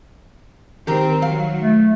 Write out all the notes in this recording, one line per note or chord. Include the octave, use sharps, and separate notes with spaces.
D#3 C4 G4 A#4
F#3 F5
A3